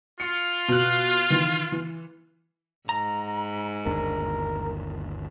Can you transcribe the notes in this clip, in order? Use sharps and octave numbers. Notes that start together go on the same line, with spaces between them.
F4 C#7
B2 F#6
D#3 E3
E3
G#2 A#5
G1 D#2 D4 A#4